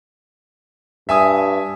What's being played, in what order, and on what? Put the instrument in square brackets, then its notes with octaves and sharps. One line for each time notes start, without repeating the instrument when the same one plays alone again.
[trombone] G2 [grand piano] E5 G#5 D#6